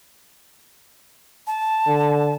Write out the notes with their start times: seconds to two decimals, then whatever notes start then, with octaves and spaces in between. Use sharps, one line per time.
1.47 A5
1.87 D3